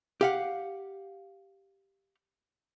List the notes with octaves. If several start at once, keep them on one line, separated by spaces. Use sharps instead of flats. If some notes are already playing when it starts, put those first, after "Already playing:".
G4 F5 F#5